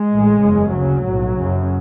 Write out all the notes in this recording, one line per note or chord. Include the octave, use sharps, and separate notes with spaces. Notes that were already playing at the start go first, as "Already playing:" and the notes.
Already playing: G#3
A1 A2
F#1 E2 C#3
D2 C#3 F#3
B1 A2
F#1 F#2 C#3